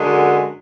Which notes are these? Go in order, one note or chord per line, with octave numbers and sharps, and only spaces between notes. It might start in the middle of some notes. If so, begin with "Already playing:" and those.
Already playing: F#2 D3 G#3